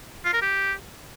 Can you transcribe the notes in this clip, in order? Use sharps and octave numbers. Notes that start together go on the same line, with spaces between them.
F4
A#4
G4